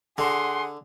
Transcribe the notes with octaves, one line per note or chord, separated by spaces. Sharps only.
D3 G#4 F#5 C6